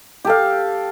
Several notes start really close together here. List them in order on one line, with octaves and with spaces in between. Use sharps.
G4 A4 F5